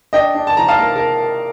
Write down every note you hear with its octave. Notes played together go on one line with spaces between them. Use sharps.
D4 D#5 G5
D4
A5
F3 A#5
F5 A5
A#3 A#4
A#4